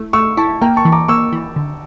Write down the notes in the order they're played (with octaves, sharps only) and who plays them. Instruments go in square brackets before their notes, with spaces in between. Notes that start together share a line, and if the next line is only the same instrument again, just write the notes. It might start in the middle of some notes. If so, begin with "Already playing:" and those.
Already playing: [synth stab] A3 E4
[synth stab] A3 [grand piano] C#6 E6
[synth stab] E4 [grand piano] A5 C#6
[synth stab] A#3 [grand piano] G5 A#5
[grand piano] A5 C#6
[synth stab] E3
[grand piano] A#5 D6
[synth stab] A#3 [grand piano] C#6 E6
[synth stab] E3
D3